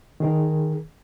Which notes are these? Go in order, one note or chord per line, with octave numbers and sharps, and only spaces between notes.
D#3 G#4 A#4